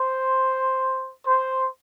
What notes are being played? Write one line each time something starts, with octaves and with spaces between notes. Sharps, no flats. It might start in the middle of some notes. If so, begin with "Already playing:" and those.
Already playing: C5
C5